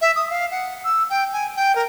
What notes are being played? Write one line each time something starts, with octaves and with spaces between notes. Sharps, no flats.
E5
D#6
F5
F#5
E6
G5
G#5
G5
A#4